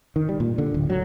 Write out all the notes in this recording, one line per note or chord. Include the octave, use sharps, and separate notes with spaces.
D#3
G3
A#2
D3
D1
F#3